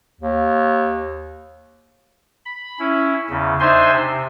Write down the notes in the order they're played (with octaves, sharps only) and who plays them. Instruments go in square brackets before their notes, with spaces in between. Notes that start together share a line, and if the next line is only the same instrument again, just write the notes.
[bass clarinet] D#2
[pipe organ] B5
C#4 E4
E2 C#3
D4 D#4 C5 E5 G#5 C6
C3